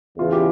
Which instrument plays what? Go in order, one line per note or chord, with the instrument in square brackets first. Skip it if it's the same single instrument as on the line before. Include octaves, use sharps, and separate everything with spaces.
[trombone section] E2 C#3 E3 [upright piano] F4
[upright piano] G4